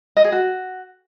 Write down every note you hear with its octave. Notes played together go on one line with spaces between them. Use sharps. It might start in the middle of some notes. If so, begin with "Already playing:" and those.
D#5
G#4
F#4